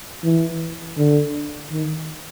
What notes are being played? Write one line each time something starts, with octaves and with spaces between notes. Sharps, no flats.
E3
D3
D#3